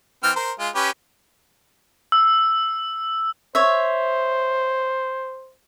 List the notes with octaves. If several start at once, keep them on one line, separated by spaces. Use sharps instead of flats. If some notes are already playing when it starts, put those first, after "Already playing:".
E3 C4 F6
A#4 C5
G#3 F4
C#4 G4 B4
E6
C5 C#5 E5